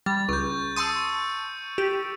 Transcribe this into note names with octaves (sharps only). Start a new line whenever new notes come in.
G3 A6
C#2 C#6 G6
A5 C6 D#6 E6 C#7 D#7
G4